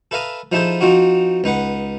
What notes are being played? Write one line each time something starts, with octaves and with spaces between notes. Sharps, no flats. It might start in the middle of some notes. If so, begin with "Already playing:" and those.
A4 B4 E5 F5 A#5 D#6
F3 D#4 E4 G#4 A4 C5
F3 C4 D#4 F4 F#4
C#2 D#4 B4 F#5